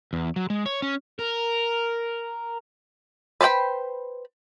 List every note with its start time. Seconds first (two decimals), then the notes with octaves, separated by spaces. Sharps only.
0.13 E2
0.36 F#3
0.50 G#3
0.66 C#5
0.82 C#4
1.19 A#4
3.41 B4 C5 D5 G5 B5